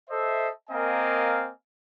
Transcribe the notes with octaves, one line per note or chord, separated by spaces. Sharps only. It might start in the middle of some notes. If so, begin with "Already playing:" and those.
A4 C5 D#5 E5
A#3 C4 A#4 D#5 F5 G#5